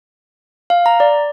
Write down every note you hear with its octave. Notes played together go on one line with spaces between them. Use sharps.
F5
A#5
D5